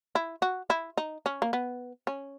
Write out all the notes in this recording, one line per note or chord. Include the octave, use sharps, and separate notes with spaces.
E4
F#4
E4
D#4
C#4
A#3
B3
C#4